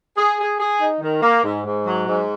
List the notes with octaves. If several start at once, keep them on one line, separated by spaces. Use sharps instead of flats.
G#4
G#4
G#4
D#4
D#3
A#3
G#2
G#2
F#3
G#2